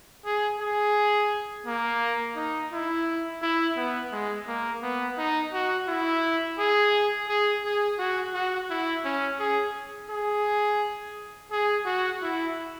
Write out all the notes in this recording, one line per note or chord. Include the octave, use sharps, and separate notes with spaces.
G#4
G#4
A#3
D#4
E4
E4
B3
G#3
A#3
B3
D#4
F#4
E4
G#4
G#4
G#4
F#4
F#4
E4
C#4
G#4
G#4
G#4
F#4
E4